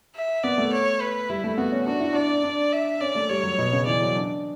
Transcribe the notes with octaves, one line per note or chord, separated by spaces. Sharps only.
E5
B3 D5
A3
C#5
B4
G3 E4
A3
B3 F#4
C#4
D4 F#4
E4
D4 D5
D4
E5
C#4 D5
A3
G3 C#5
F#3
B2
C#3
E3 D5
F#3
D4